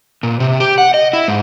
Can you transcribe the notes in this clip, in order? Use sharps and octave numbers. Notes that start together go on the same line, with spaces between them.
A#2
C3
G4
F#5
D#5
E4
G#2